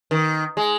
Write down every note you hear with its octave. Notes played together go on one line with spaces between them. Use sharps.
D#3
G#3